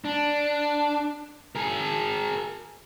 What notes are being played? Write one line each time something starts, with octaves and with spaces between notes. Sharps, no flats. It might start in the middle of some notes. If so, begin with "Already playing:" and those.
D4
G#4 A#4